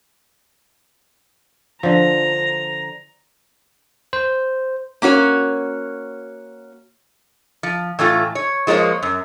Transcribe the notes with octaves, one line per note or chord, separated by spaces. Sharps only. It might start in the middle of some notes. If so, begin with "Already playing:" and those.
D3 F3 A#5
C5
A#3 C#4 F#4 C#5
F3
A2 E3 A3 F4
C#5
F3 G#3 A#3 F4 C#5
F#2